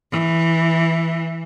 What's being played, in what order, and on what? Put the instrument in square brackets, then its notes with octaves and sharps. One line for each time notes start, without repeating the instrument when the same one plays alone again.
[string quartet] E3